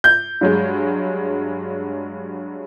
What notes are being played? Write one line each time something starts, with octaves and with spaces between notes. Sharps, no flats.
G6
G2 F#3 G#3